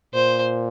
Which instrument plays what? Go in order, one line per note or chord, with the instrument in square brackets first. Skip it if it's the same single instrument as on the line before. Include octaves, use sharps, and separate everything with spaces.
[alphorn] A#2 [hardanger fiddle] C5